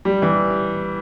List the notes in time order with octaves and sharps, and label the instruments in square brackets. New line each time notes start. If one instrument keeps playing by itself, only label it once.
[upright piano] G3
E3